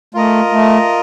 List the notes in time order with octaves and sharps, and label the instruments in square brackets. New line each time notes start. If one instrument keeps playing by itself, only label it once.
[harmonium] A3 [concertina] F4 A#4 D#5
[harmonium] A3